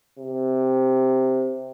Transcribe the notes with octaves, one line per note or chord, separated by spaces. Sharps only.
C3